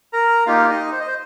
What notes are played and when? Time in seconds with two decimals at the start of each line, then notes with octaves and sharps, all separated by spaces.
0.13 A#4 A#5
0.46 A#3 D#4 F4 G4 F5
0.70 D#4 D#5
0.92 C5
1.00 D#5
1.07 C5